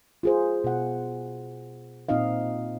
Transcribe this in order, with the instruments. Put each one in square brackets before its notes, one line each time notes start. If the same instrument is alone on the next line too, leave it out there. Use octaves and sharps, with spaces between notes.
[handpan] F4 G#4 C5
B2 F#5
A#2 C4 D#4 D#5 F5